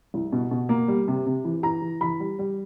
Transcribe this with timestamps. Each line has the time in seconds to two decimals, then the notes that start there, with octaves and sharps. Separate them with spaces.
0.14 C2
0.32 B2
0.51 B2
0.69 A#3
0.88 G3
1.08 C3
1.26 C3
1.45 E3
1.63 E3 A#5
1.82 E3
2.01 E3 B5
2.20 G3
2.39 G3